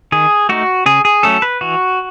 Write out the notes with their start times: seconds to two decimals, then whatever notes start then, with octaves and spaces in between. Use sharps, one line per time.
0.12 D#3 G#4
0.49 A3 D#4 F#4
0.86 C#3 G#4
1.05 G#4
1.23 F#3 A3 C#4 A4
1.42 B4
1.61 E3 F#4